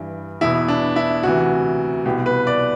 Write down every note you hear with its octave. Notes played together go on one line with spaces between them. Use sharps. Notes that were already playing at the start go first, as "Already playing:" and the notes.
Already playing: G2 E3
E2 B2 E4
D4
E4
D2 C3 E3 F#4
C2 B2 G4
B4
D5